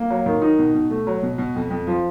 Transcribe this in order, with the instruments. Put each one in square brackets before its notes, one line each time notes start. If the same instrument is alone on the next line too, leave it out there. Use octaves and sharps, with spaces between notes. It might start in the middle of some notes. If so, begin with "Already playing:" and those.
Already playing: [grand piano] A#3
F#3
D#3
D#4
B2
B2
A3
F#3
B2
B2
F2
F2
F3